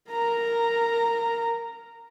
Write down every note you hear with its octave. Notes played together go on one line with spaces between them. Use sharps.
A#4 A#5